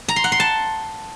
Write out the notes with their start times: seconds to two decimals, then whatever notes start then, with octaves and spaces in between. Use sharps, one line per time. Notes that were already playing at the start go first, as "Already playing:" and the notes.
0.08 A#5
0.16 C6
0.24 F#5
0.32 C6
0.40 A5